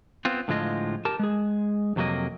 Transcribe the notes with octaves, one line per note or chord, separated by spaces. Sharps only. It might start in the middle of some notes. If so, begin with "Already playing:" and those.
B3 C4 F4
A2 D3 F3 G#3 F4 D#5
G4 A#4 A5
G#3 G#4
F2 C3 F#3 A#3 D#5